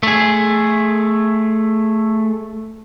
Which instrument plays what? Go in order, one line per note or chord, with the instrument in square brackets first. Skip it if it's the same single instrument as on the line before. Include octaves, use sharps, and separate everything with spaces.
[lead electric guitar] A3 G#4